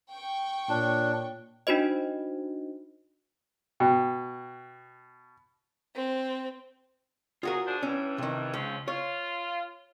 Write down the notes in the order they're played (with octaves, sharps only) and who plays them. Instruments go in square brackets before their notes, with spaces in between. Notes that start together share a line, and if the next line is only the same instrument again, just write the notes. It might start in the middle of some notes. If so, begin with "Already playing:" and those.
[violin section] G5 C#6
[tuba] A#2 [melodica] D4 [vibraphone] F4 C#5
[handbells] D4 D#4 F#4 C5 D#5
[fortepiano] B2 [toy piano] G5
[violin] C4
[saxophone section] F#3 G#4 [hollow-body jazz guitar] F4 F#4 A#4
[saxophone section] D4 G#4 C5
[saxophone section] G2 E3 [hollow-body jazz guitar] C#4
[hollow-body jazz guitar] C3 D#3
[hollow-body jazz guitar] C#2 [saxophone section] F3 C4 C#4
[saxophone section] F4 [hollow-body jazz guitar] C#5